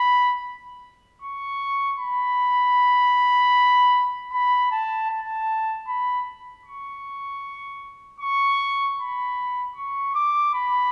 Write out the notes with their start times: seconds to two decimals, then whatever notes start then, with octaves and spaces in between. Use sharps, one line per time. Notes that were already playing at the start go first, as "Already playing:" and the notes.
Already playing: B5
1.22 C#6
1.99 B5
4.32 B5
4.72 A5
5.10 A5
5.88 B5
6.66 C#6
8.20 C#6
8.99 B5
9.76 C#6
10.15 D6
10.54 B5